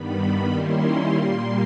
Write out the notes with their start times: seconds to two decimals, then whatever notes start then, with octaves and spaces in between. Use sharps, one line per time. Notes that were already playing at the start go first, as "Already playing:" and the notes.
Already playing: G2 D#3 G3 B3 B5
0.53 D#3 G3 A#3 C#4 E4 C6
1.15 A#2 G3 A#3